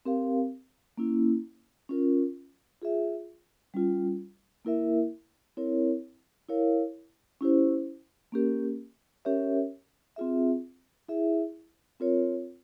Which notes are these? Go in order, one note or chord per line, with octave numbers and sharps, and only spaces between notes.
C4 G4 A#4 F5
A#3 C#4 E4
C#4 F4 A#4
F4 G#4 E5
G3 C#4 F4
A#3 E4 A#4 E5
C4 E4 A#4 C#5
E4 A#4 C#5 F5
C#4 E4 G4 C5
A#3 C#4 G4 A#4
C#4 G4 A#4 C#5 E5
C4 F4 G#4 E5
E4 G#4 E5
C4 F4 A#4 C#5